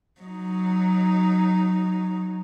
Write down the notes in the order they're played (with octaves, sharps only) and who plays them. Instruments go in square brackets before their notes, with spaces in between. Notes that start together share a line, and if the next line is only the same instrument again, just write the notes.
[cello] F#3 D#4